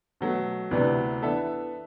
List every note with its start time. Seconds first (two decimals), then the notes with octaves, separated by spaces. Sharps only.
0.21 B2 F#3 A3
0.71 D2 C3 E3 B3 D4
1.22 E3 B3 D4 A4 E5